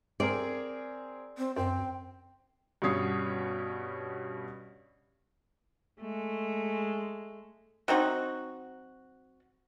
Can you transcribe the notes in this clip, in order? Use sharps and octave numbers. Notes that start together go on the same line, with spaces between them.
C4 G#4 A#4 D5
C4
F#2 C4 G5
G2 B2 C#4 C#5 D#6 C7
G#3 A3
F#3 C4 D#4 F#4